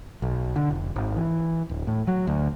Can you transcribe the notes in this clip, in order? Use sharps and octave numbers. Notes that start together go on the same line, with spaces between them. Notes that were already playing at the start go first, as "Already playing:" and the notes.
B1
D3
F1
G#1
E3
D1
A2
F#3
D2